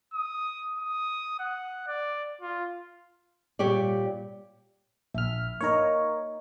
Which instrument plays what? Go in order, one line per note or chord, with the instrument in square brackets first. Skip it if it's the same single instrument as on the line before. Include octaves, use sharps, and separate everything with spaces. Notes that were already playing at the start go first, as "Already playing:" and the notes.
[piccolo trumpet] D#6
D#6
F#5
D5
F4
[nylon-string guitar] A#2 G3 G4 C#5 D5
[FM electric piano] A#1 F6 [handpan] E5
[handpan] A#3 D#4 D#5 [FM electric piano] A#4 C#5